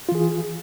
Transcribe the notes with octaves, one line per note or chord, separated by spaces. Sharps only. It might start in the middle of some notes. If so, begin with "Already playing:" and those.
E3 F4 G#4